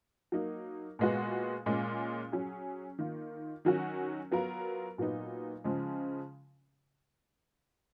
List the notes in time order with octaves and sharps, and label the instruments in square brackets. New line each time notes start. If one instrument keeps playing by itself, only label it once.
[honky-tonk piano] F#3 A#3 D#4
A#2 G#3 B3 F#4
A#2 G#3 C#4
F#3 C#4 G#4
D#3 A#3 F4
D#3 F#3 C#4 F#4
F#3 B3 F4 A#4
A#2 F#3 B3 D#4
C#3 F3 G#3